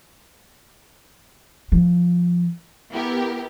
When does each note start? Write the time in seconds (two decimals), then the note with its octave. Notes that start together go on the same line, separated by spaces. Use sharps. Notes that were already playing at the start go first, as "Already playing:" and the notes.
1.72 F3
2.92 B3 E4 G4 A#4